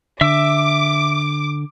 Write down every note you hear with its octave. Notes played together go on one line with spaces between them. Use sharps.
D3 E5 D6 E6